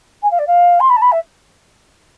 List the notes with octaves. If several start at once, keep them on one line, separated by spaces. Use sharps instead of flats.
G#5
F5
D5
F5
C6
B5
A5
B5
E5